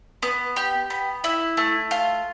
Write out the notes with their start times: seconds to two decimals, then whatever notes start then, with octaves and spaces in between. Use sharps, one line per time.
0.22 B3
0.56 G4
0.90 B3
1.24 E4
1.57 A3
1.91 F4